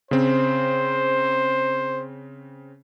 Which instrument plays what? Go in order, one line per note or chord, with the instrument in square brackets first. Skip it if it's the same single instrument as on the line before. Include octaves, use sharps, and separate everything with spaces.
[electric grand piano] C#3 C4 [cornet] C5